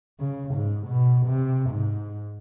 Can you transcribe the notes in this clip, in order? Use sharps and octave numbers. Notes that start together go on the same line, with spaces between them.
C#3
G#2
B2
C3
G#2